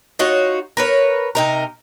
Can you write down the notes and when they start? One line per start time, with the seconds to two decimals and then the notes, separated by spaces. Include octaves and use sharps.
0.19 D#4 F4 F#4 C#5
0.77 A#4 B4 C#5
1.35 C3 D#4 A#4